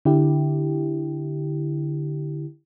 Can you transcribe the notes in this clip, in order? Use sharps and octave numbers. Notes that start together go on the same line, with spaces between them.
D3 E4 G4